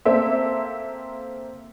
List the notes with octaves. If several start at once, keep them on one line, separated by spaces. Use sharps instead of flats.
A#3 C4 A4 E5